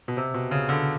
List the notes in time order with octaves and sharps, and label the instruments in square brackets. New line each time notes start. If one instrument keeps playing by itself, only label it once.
[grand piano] B2
C3
B2
C#3
D3